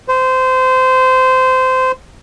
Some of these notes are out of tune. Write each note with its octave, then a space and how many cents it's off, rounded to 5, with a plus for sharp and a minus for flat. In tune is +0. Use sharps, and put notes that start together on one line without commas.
C5 -20